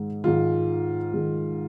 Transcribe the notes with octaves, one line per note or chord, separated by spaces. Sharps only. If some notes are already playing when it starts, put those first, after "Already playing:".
Already playing: G#2 D#3 G#3
G#2 D#3 G#3 F4
G#2 D#3 G#3